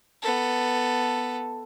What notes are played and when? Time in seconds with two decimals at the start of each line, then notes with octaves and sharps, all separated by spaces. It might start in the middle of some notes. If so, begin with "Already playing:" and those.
0.23 B3 A4